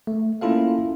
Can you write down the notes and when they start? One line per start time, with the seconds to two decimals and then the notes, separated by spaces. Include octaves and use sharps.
0.07 A3
0.41 A#3 C#4 E4 F4 A4 F5